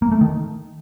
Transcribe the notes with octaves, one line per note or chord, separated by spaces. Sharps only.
A#3
A3
D#3